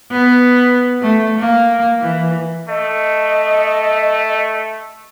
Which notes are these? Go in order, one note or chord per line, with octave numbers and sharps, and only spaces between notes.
B3
A3
A#3
E3
A3 D#5